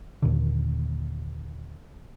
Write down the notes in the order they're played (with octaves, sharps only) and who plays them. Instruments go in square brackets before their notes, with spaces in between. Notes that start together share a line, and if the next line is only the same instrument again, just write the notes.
[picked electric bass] D#2 A#2 D3